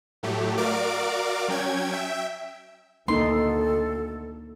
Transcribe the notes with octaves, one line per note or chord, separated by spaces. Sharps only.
A2 F#3 A3 G4
F#4 A#4 D5 F5 D6 D7
F#3 C#4 G5 G#6
E5 G5
D2 A#3 D#4 A4 C6